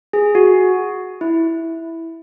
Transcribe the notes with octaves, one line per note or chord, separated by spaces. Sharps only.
G#4
F#4
E4